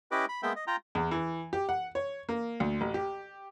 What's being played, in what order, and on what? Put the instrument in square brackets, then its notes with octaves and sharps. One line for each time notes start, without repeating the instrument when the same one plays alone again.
[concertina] C#4 E4 G4 B4 D#5 D6
B5
G#3 A#3 B3 E5 G5
D#5
F4 G5 A#5
[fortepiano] E2
E3
G4
F#5
C#5
A#3
D2
A1
G4